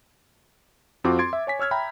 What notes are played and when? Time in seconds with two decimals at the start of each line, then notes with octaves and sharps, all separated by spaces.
1.04 F2 C4 F4 F#4 D6
1.19 C6 G#6 A6 D7
1.33 E5
1.47 C#5 G#5 B6
1.59 C#5 E6 F6 G#6
1.71 E5 G5 A#5 B5